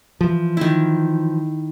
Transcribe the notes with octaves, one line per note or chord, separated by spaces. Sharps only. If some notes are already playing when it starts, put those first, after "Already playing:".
E3 F3
D#3 E4